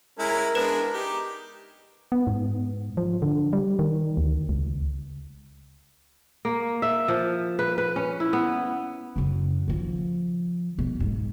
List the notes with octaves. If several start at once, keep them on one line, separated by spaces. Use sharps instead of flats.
G#3 C#4 E4 A#4
G#3 B3 D4 B4 E7
D#4 G4
B3
G#2
F3
D3
G3
D#3
D2
C#2
A#3
E5
F3
B4
B4
C#4
E4
B3
F#2 C#3
D#3 F3
B2
G#2